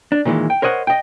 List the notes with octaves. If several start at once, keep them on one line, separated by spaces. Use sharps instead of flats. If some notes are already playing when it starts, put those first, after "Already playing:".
D4
A#2 D#3 E3 G#3
G5
A#4 C5 C#5 D#5 F#5
D#5 G5